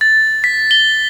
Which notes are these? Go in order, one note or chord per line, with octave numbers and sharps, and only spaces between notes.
A6
B6
G7